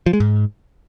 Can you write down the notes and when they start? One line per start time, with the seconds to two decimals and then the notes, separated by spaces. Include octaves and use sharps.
0.06 F3
0.13 G#3
0.20 G#2